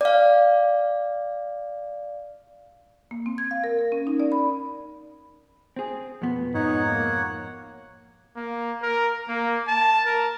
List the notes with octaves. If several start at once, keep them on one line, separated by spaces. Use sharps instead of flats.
D5 F5
A#3
C4
G#6
F5
A#4
A#4
C#4
D#4
D5
B5
C4 G#4
F2 B2 B3
G#2 D#4 C#5 F#5
A#3
A#3
A#4
A#3
A5
A#4